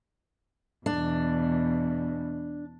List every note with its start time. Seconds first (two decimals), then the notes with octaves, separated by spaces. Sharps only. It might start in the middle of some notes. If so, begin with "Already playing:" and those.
0.86 E2 B2 D4